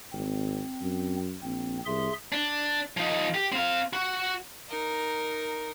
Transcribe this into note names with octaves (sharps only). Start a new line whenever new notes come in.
G#1 C4
F#2
A#1 C4
C2 G#4 E5 C6
D4
F3 D#4
G4
C4 F5
F#4
D#4 A#4